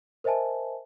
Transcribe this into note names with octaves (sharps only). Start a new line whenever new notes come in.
A#4 C5 D#5 E5 G#5 A5